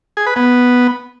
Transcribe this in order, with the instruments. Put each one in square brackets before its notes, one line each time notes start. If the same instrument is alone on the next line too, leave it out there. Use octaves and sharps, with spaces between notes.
[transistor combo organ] G#4
B4
B3